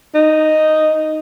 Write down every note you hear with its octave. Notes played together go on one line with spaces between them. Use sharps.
D#4